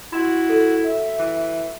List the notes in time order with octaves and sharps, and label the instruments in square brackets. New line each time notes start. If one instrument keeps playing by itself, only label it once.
[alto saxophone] E4 [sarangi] F#4 [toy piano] C6
[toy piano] A4
[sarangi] E5
[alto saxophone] E3